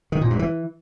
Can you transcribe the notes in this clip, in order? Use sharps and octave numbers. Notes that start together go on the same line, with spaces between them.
D#3
A#2
G2
E3